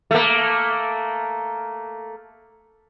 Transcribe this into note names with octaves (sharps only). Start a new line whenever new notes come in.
A3 A#3